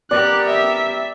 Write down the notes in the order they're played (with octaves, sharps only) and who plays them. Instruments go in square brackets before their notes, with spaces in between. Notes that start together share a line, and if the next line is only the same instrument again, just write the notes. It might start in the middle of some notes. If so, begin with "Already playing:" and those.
[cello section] B3 G4 A#4 [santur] D5 [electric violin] F#6
[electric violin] E5